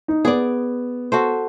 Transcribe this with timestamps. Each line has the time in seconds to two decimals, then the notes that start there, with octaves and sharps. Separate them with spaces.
0.08 D#4
0.25 B3 G#4 D5
1.12 F#4 A4 C5